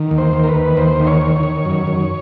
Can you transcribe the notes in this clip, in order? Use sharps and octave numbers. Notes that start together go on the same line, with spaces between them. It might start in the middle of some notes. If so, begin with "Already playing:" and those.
Already playing: D#3
D#2
C5
D#3
A#4
B4
D#2
D#2 C5
D#3
C#5
D#3
C#5
D#3
F#2
F#2